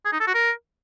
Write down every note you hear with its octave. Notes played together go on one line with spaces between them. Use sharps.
G#4
D#4
A4
F#4
A#4